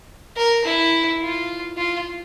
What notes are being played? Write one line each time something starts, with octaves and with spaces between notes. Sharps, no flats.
A#4
E4
F4
F4